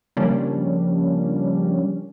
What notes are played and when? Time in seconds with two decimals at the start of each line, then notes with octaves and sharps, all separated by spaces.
0.17 C#3 F3 G3 A#3 C#4 D4